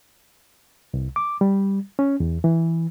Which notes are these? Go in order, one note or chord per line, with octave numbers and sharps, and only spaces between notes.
C2
D6
G3
C#4
E2
E3